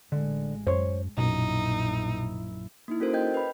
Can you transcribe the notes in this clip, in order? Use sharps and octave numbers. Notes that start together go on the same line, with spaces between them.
A1 D3 G#3
F#2 C5 C#5
A#1 F#2 B2 D#4 E4
A#3 D#4 E4
C#4 F#4 A4 A#4 C5
D#5 G5 G6 G#6
B4 B5